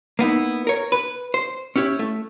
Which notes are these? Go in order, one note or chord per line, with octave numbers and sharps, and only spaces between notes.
A#3 B3 D#4 E4
A#4 C#5
B4
C5
C#4 E4 G4 C#5
A3